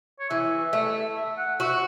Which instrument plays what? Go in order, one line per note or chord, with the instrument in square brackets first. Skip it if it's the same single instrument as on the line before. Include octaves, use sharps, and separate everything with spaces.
[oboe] C#5
[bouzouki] E3 [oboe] E5
[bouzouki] A3
[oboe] E5
F#5
[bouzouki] F#4 [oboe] E5